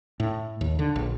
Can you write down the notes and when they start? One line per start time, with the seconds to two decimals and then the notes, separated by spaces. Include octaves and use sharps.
0.20 A2
0.61 D#2
0.79 D3
0.96 A#1